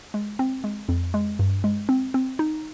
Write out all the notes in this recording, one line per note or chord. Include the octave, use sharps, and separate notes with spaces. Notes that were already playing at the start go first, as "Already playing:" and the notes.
G#3
C4
G#3
F2
G#3
G2
G#3
C4
C4
D#4